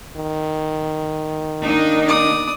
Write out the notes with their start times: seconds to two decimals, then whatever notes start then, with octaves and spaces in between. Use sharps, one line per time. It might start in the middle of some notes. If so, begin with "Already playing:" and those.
0.17 D#3
1.63 A#3 D4 D#4
2.07 D5 D#6